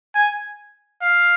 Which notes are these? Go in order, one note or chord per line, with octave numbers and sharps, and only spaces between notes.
G#5
F5